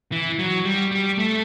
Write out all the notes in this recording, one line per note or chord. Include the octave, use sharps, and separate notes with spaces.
E3
F#3
G3
G3
A3